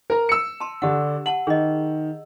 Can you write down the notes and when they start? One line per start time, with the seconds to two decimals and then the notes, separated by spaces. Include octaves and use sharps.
0.10 A#4 A#5
0.29 E6 C#7
0.60 A5 C6
0.82 D3 D4 G4 F#5
1.26 F#5 A5 F#7
1.47 D#3 G#4 D#5